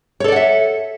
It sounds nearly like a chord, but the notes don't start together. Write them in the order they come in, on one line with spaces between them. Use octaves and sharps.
C#5 A4 D5 F#5 E5